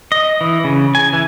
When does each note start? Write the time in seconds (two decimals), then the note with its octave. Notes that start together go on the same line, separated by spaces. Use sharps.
0.12 D#5
0.41 E3
0.64 C#3
0.95 G#5
1.13 E3